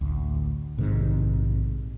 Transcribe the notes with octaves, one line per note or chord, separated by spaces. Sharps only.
A1 D2
A#1 G#2 C3 D#3